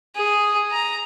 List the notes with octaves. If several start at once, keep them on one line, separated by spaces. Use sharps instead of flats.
G#4
A#5